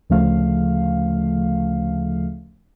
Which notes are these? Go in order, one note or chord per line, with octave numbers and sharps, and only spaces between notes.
D2 C#3 F3 A3 F5